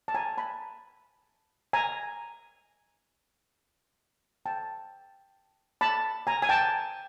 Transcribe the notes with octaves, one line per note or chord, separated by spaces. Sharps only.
A5
G#5 A#5
A5 B5
G#5 A#5
G5 A5
A5 B5
G#5 A#5
G#5
G5 A5